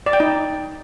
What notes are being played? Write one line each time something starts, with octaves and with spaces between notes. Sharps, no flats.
D5
G5
D#4